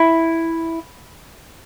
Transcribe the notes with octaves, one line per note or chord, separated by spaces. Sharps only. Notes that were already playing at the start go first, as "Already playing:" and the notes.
Already playing: E4